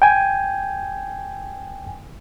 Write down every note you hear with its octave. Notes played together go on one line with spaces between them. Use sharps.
G5 G#5